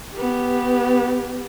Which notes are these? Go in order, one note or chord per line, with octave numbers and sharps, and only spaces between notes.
B3 G4